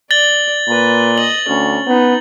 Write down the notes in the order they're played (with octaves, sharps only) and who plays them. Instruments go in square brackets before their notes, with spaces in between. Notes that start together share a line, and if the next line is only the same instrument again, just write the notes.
[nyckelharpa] D5 [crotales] A6 F#7 G7
[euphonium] A#2 [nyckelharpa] B4
[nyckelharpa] D#5 [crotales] F#7
[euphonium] D2 [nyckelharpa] C#4
[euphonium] B3 [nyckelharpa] D#4